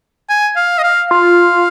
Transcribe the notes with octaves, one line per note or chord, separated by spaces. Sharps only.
G#5
F5
D#5
F5
F4 F5